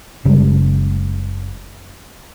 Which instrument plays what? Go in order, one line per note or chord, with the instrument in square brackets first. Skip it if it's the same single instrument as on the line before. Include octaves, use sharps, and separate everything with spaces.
[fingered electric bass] F#1 C#3 G3 G#3